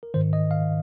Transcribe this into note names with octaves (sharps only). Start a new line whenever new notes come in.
A#4
G#2 D#3 C5
D#5
F5